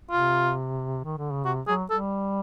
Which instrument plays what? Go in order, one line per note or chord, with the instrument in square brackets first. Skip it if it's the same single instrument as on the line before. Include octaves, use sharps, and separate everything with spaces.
[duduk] C3 [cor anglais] F4
[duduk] D#3
D3
C#3
[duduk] C3 [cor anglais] F#4
[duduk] F#3 [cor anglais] G#4
[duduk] G3 [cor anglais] A4